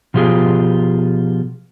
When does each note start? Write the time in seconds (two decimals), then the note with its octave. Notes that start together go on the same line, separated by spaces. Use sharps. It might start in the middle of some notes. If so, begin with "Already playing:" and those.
0.14 B2 F3 F4 G4 G#4